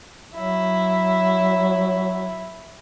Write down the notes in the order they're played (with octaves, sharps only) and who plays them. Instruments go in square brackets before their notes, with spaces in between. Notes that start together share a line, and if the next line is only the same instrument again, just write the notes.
[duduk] F#3 [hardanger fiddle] E4